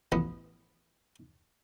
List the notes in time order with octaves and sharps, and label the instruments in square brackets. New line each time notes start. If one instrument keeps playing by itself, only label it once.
[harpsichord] A1 B3